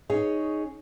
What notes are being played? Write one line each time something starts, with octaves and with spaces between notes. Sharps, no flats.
C#4 D#4 G#4 C#5